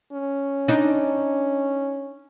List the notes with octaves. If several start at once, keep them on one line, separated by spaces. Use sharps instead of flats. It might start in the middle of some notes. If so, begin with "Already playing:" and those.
C#4
D4 D#4